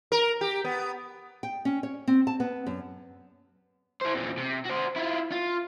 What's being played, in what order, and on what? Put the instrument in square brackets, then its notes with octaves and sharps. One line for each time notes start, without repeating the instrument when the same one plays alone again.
[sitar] A#4
G4
B3
[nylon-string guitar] G5
C#4
C#5
C4
A5
B3
F#2
[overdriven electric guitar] E4 C5
E2 A#2
C3
F#4 C5
E4 F4
F4